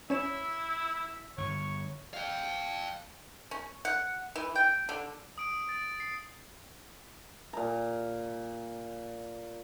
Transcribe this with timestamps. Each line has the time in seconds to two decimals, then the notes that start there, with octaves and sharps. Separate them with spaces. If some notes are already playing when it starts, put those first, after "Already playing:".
0.10 C#4 E4 C#5 E5 E7
1.38 G1 C#5
2.14 F5 G5
3.51 C#4
3.85 F#5
4.36 E3
4.55 G5
4.89 D3
5.38 D#6 D7
5.69 A6
6.00 C7
7.53 A#2 A#5